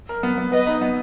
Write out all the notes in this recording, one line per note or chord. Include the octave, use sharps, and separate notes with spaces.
A#4
B3
B3
B3 B4 D#5
D#4
B3